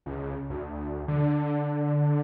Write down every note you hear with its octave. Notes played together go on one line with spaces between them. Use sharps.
C#2
D2
D3